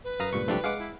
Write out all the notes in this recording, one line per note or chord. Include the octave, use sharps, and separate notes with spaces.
B4
F#2 F5 A#5 D#6
C#2 G2 A#2 C#6
C2 F3 A3 D4 G4
G#3 G#4 F5 F#5 D6
E4